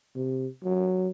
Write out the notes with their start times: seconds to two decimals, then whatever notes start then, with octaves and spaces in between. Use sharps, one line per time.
0.16 C3
0.64 F#3